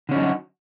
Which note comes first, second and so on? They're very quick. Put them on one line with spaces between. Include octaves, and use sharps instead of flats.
D3 C#4 D#4 F#3 F#4